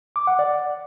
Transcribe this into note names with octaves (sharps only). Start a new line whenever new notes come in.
D6
F#5
D5